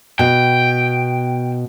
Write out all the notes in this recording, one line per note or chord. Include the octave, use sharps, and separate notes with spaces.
B2 G5